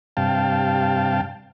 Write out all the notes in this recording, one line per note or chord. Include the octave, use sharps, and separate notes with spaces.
G2 C3 F5 G5 A5